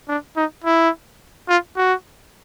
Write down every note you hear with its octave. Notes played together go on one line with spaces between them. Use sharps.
D4
D#4
E4
F4
F#4